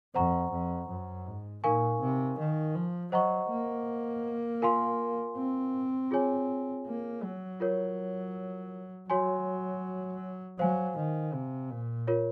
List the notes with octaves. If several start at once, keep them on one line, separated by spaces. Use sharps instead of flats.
F2 C5 F#5 A#5 C#6
F2
F#2
G#2
A#2 D#4 A#4 F5 G#5 C#6
C3
D#3
F3
F#3 C5 D#5 F#5 A#5 C#6
A#3
F4 A#4 F5 G#5 C6
C4
F4 G#4 C#5 G#5
A#3
F#3
F4 A#4 C#5
F#3 F#4 C#5 G#5 C6
F#3 C5 F5 G#5
D#3
C3
A#2
F4 A#4 C#5